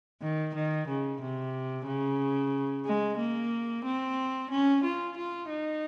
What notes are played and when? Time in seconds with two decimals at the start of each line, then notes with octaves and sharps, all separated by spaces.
0.22 D#3
0.55 D#3
0.88 C#3
1.21 C3
1.87 C#3
2.85 G#3
3.18 A#3
3.85 C4
4.51 C#4
4.84 F4
5.17 F4
5.49 D#4